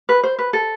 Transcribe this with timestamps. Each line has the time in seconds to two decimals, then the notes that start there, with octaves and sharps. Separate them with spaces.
0.09 B4
0.23 C5
0.39 B4
0.53 A4